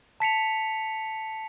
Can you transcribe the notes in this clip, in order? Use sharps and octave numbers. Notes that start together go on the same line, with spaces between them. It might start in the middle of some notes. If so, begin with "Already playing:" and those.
A5 B6 C#7 F7